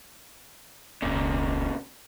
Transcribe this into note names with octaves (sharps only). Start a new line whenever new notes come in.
E1 C#2 A#2 C#3